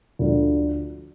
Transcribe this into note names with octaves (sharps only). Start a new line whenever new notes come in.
D2 D3 F3